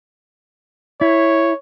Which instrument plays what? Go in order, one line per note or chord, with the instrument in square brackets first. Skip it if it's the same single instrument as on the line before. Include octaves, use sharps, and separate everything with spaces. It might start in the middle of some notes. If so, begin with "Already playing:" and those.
[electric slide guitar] E4 [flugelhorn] C#5